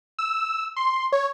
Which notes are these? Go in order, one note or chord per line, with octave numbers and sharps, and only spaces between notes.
E6
C6
C#5